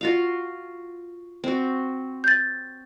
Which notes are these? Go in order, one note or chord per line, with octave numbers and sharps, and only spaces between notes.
F4 F#4 F5
C4 F#4
G6 A6